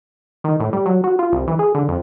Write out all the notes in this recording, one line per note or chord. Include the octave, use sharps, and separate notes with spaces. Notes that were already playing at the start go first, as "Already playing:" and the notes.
D#3
A2
G3
F#3
F#4
F4
C2
E3
G#4
D3
F2